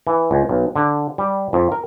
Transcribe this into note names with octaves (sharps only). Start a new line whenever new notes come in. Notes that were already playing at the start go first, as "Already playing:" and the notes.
E3
C#2
B1
D3
G3
F2
A#4